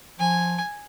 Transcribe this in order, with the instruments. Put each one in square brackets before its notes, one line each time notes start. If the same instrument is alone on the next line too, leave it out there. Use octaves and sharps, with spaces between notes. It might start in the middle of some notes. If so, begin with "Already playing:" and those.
[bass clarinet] F3 [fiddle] G#5